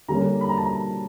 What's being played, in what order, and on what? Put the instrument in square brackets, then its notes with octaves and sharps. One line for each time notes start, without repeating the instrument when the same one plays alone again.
[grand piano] D3 G3 A#3 C#4 A#5
B5
A#5
A5
A#5